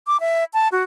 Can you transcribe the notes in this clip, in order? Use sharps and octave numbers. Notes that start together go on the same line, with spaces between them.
D6
E5
A5
F#4